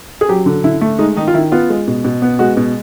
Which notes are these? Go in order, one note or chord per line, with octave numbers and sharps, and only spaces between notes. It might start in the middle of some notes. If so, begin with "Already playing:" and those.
G#4
F#3 G4
D3
D3 E4
A3
G#3 D#4
D#3 D#4
F4
D#3 E4
B3 F4
G#3
B2
B2
B3
G#3 F#4
B2